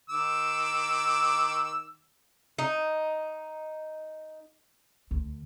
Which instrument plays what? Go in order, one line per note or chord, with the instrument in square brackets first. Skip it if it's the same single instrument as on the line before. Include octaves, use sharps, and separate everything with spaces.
[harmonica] D#3 D6 E6
[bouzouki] D#4
[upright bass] D2